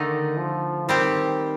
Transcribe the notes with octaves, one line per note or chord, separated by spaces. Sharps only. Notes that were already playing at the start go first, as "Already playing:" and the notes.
Already playing: D3 D#3 A3 D#4
F3
D#3 G3 C4 G4